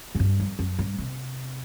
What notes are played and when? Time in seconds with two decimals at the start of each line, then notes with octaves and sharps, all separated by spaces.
0.15 G#2
0.20 G2
0.40 F2
0.59 F#2
0.79 G2
0.98 C3